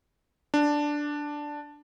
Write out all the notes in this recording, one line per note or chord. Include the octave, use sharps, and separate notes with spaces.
D4